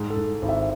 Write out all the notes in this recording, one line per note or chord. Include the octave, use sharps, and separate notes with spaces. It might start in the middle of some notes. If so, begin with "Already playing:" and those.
Already playing: G#2
A4
G#2
G#1
E5